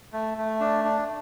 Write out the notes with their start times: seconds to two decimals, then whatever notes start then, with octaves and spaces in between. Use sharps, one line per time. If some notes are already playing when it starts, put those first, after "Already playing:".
0.13 A3
0.38 A3
0.61 D4
0.85 D4